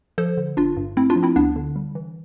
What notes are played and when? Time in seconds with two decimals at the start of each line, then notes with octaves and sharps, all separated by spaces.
0.18 F3 A4 C5
0.37 D3
0.57 G1 D4 F4
0.77 G2
0.97 A3 C4 E4
1.10 D4 F4
1.16 F3
1.23 C4 E4
1.36 D2 B3 D4
1.56 D3
1.76 G3
1.95 E3